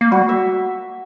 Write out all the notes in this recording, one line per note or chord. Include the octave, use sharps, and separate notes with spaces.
A#3
G3 F#4
E5